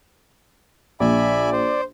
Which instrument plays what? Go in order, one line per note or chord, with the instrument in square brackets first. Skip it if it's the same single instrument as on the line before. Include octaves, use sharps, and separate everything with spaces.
[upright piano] A#1 [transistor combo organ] D5 [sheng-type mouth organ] E5 G#5 B5
[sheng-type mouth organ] C5